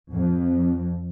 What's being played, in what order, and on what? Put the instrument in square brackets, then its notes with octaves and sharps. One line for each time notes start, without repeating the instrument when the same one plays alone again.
[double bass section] F2